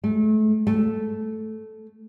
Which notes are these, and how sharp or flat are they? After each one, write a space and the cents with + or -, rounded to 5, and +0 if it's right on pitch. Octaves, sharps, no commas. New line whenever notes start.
A3 -30
A3 -10